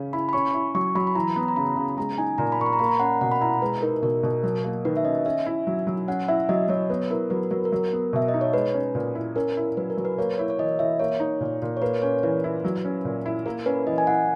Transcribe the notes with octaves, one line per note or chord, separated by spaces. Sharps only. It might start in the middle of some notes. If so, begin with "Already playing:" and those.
Already playing: C#3 C#4
E4 B5
B5
C#4 C#6
E4
F#3 C#6
F#3 B5
B5
E3 A#5
B3 B5
A#5
C#3 B5
C#3
G#3 A#5
D#4 G#5
A#2 A#5
B5
A#2 C#6
B5
A#5
A#3 B5
A#5
C#4 F#5
B2 F#5
B5
E4 A#5
G#3 B4
D#4 A#4
B2 A#4
B2
F#3
A#3
D#3 B4
E5
C#4 D#5
C#4 E5
E4
F#3
F#3
C#4 F#5
E4 E5
F#3 D#5
F#3 C#5
B3 B4
E4 A#4
F#3 B4
F#3 A#4
A#4
F#3
B3
B2 E5
D#5
D#4
C#5
G#3 B4
C#4
A#2
E4
C#4 A#4
E4
F#3 B4
A#4
F#3
B4
A#3 C#5
E4 C#5
C#5
E3 D#5
E3 E5
A#3 C#5
D#4
A#2
A#2
C#5
A#3 B4
C#4 C#5
E3 B4
E4
F#3
C#4
A#2
E4
A#3 A#4
C#4 B4
E3 D#5
G#5
E4 F#5